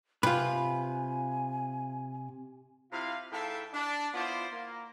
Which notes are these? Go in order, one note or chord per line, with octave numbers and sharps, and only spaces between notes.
C3 F4 B4 G#5
C3 E4 F4 F5
G#2 E4 A4 E5 F5 G5
D4
B3 E4 F4 C5 D5
A#3